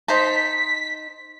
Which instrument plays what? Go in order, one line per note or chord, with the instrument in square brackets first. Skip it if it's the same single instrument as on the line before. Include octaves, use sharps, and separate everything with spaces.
[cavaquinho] D#4 C5 A5 [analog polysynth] B6